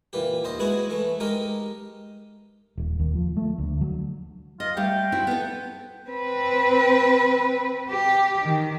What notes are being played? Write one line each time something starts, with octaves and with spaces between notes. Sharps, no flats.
A#2 E3 G4
D#2 C5 D#5
G#3 B3 E4 F#4 G#4
E3 A3
G#3 D#4 G4 A#4
D#1
D#2
F3
A3
D2
F#3
F4 D#5
G3 A3 F5 G5
C4 E4 F#4
B3 A4
C4 B4
G4
D#3